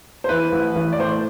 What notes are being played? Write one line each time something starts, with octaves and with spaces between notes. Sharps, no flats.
C5
E3 B4
A1
A1
D5
A2 C5